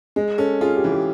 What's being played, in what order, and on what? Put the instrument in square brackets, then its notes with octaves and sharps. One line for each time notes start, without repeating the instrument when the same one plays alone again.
[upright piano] G#3 [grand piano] G#4
[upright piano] C#4 [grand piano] A4
[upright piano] F4 [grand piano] G#4
[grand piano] G4
[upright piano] E3
[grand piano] G4